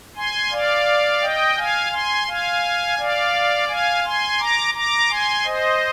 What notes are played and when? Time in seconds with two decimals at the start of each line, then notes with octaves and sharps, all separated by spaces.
0.16 G#5 C6
0.52 D5 F5
1.22 D#5 G5
1.57 F5 G#5
1.92 G#5 C6
2.28 F5 G#5
2.98 D5 F5
3.68 F5 G#5
4.04 G#5 C6
4.39 A#5 D6
4.74 A#5 D6
5.09 G#5 C6
5.45 C5 D#5